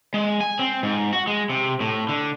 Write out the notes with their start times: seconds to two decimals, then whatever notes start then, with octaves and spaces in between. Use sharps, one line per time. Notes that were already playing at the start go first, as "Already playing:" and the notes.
0.14 G#3
0.41 G#5
0.59 C4
0.83 G#2
1.13 F#4
1.27 G#3
1.50 C3
1.80 A2
2.09 D3